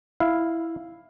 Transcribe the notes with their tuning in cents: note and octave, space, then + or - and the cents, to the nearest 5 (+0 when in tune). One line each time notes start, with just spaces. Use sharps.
E4 +0 F5 +0